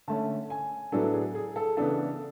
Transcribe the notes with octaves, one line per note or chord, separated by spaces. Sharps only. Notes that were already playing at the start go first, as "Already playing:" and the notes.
D3 A3 C#4 A5
G#5
A2 F#3 B3 D4 A4
G#4
G#4
A4
C#3 E3 B3 D4 A4